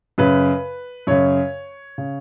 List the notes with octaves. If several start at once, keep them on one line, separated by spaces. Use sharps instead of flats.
F#2 C#3 B4
F#2 C#3 C#5
C#3